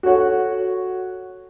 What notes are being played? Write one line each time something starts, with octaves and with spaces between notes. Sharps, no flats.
F#4 A4 C#5 F#5